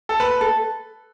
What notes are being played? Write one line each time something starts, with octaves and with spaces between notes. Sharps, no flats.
A4
B4 A5
A4